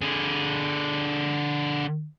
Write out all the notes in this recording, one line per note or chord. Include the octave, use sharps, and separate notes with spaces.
D3 G#4